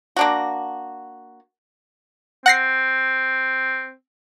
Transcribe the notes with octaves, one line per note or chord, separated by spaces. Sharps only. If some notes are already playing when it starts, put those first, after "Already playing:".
A#3 D4 F#4
C4 F#5 A#6 C7